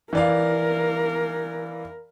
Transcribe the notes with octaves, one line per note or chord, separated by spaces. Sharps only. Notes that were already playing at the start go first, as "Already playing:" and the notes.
E3 A#4 D5 F5